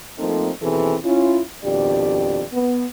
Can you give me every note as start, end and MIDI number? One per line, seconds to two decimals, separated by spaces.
0.19 0.50 53
0.19 0.50 57
0.19 0.50 58
0.19 0.50 60
0.19 0.50 63
0.19 0.50 69
0.62 0.96 39
0.62 0.96 47
0.62 0.96 52
0.62 0.96 60
0.62 0.96 68
0.62 0.96 69
1.04 1.40 61
1.04 1.40 64
1.04 1.40 65
1.64 2.43 41
1.64 2.43 47
1.64 2.43 51
1.64 2.43 62
1.64 2.43 67
1.64 2.43 74
2.52 2.84 59